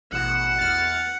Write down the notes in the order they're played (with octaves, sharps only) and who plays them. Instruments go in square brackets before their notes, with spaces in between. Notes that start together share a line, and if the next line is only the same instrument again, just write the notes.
[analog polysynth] A1 B2 E7 [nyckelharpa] F#5
[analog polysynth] E2 F6 A6